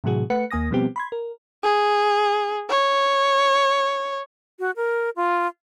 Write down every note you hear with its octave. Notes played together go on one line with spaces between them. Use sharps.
A2 C3 E3 F#3 F#4 G#4
A3 B4 F#5 C#7
D#2 A#3 G#5 D#6 A#6
B2 F3 G3 B3 C4 G4
B5 C6 G#6
A#4
G#4
C#5
F#4
A#4
F4